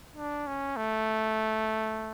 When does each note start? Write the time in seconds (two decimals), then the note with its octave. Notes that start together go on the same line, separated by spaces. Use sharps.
0.17 D4
0.47 C#4
0.77 A3